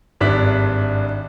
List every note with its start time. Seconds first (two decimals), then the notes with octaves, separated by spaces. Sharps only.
0.20 G#1 G2 D4 E5 F#6 B6